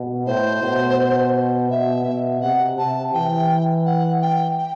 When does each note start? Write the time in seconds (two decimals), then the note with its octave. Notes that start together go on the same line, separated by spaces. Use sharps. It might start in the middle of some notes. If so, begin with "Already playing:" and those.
Already playing: B2
0.27 A2 C5
0.63 B2
1.70 B2 E5
2.06 B2
2.42 C3 F#5
2.78 C3 A5
3.14 E3 G5
3.86 F#5
4.22 G5
4.58 G5